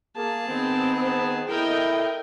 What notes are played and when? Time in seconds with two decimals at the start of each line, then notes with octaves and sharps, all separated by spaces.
0.17 A#3 G#4 A5
0.47 D#3 B3 C4
1.50 E4 A4 A#4 D#5 G5